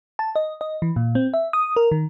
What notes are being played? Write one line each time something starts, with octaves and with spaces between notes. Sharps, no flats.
A5
D#5
D#5
E3
A#2
C4
E5
D#6
A#4
D#3